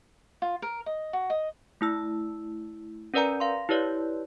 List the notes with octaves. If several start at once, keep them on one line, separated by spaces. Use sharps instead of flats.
F4
A#4
D#5
F#4
D#5
A3 E4 E6
C#4 A#4 B4 D5 G#5 A#5
F5 C6
E4 G4 B4 C#5 D5